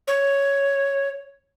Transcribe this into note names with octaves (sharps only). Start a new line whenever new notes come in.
C#5